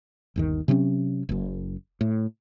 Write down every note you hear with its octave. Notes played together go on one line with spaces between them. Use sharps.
G1 D#2 D#3
C3 F#3 C4 C#4
F#1 F#2
A2